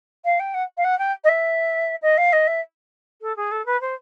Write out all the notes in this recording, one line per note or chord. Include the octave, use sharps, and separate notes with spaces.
F5
G5
F#5
F5
F#5
G5
D#5
E5
D#5
F5
D#5
E5
A4
G#4
A4
B4
C5